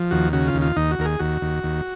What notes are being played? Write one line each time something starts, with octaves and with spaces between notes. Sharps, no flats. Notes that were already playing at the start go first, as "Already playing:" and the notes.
Already playing: F3
D#2 F#4
C#3 F#4
F4
D#2
F4
D#2 D#4
F#4
D#2 A#4
G#4
D#2 F#4
D#2
D#2